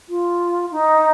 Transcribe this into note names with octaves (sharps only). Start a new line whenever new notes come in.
F4
D#4